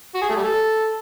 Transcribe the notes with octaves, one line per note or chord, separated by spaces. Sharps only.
F#4
G#4
A3
G3
A4